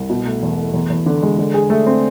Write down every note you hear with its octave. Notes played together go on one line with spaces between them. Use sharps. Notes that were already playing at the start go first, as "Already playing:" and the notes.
Already playing: C2
B2
A3
E2
A3
E2
E2
D3
G#3
D3
G#4
A3
C4